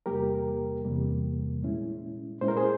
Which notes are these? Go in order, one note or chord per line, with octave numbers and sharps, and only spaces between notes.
E2 C3 G3 A#3 G4 A#4
E2 C3 G3 A#3
A#2 G#3 C#4 E4
A#2 G#3 C#4 E4 C5
A#4
G#4 C5